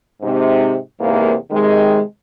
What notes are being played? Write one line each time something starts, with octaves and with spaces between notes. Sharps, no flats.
G#2 C3
E2 G#2 C3 A#3
C3 D#3 G#3